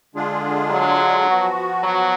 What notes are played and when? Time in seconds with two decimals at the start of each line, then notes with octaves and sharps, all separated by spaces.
0.15 D3 G#3 D4 F4 G#4
0.70 F#3
1.27 F3 B3 F#4
1.83 F#3